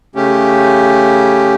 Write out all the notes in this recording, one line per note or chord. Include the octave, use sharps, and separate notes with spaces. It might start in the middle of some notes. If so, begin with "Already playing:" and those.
C#3 A3 C#4 G4